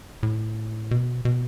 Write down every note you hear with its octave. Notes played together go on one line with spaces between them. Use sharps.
A2
B2
B2